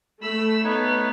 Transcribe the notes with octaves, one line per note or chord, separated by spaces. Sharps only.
A3 B5 E6
B3 D#4 B4 C#5